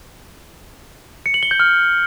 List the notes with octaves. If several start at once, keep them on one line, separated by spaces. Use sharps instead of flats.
C#7
F#7
G7
G6
F6